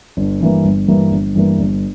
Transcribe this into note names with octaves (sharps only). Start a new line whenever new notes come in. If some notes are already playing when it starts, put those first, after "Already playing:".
G1
G2 E3 A#3
G1
G2 E3 A#3
G1
G2 E3 A#3
G1